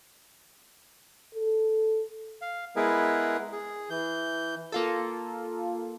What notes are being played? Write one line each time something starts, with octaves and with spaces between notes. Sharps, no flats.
A4
F5
G#3 B3 E4 G#4 A#4 B4
G#4
E3 G6
A#3 F4 A4